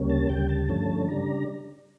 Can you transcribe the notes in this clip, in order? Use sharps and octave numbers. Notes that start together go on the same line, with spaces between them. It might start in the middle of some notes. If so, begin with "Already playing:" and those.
Already playing: D2 C#3 G3 A#3 C#4
A5
D2 C#3 G3 G5
A5
G2 D3 F3 A3 C#4
C#3 G3 D4 A#5